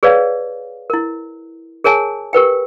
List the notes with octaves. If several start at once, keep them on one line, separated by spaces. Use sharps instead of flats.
G#4 B4 C#5 D5 F5
E4 A#4
G#4 A#4 C#5 G#5 A5
G4 A#4 B4 G5